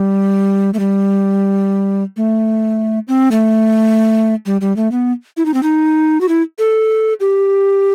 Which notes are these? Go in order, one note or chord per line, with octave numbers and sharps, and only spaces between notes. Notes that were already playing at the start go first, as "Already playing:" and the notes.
Already playing: G3
A3
G3
A3
C4
A3
G3
G3
A3
B3
E4
D#4
C4
D#4
F#4
E4
A4
G4